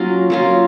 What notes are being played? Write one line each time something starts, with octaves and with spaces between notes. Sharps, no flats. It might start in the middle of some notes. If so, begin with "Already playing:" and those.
Already playing: F#3 A#3 C#4 F4
F#3 A#3 C#4 F4